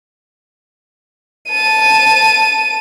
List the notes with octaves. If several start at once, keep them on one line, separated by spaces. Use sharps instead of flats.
A5 D#7